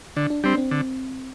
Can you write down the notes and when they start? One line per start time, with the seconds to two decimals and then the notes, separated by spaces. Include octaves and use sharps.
0.16 D3 D4
0.30 D4
0.44 G3 C4 D4
0.57 C4
0.71 D3